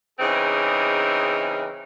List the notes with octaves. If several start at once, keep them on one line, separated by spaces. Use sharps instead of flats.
C#3 E3 C4 D#4 G#4 A#4